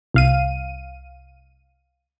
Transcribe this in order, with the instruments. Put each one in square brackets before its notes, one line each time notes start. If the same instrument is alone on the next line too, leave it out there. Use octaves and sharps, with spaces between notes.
[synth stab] C2 F5 D#7